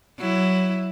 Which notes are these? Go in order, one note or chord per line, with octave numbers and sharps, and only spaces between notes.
F#3 E4